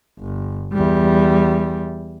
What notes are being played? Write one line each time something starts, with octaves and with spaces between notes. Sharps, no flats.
G1
E2 G3